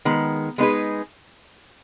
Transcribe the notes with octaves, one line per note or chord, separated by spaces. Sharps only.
D#3 G#3 B3
G#3 B3 D#4 G#4 B4